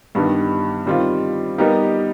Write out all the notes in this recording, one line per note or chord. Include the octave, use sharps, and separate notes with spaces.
G2 D#3 G3 B3
D#3 G3 C4 F4
G3 B3 D#4 G4 A#4